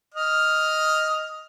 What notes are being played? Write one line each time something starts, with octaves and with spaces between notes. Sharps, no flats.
D#5 F6